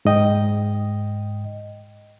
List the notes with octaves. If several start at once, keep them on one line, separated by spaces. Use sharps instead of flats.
G#2 D#5 G5